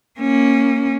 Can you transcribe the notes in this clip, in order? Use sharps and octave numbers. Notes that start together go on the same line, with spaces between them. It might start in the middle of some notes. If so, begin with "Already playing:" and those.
A#3 C#4